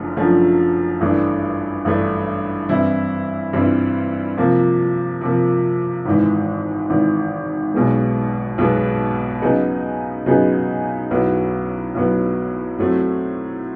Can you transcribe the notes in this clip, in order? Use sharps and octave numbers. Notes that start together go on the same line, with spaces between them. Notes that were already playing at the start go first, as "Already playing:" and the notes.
Already playing: F#1 F#2 D3 F3 A3
F#1 F#2 D3 F3 A3
A1 G2 E3 A3 D4
A1 G2 E3 A3 D4
G2 E3 G3 C4 E4
G2 E3 G3 C4 E4
C3 F3 A#3
C3 F3 A#3
G#1 G#2 E3
G#1 G#2 E3
B1 B2 G#3 B3
B1 B2 G#3 B3
C#3 F#3 B3 D#4 G#4
C#3 F#3 B3 D#4 G#4
B1 A2 F#3 B3
B1 A2 F#3 B3
A2 F#3 A3 C4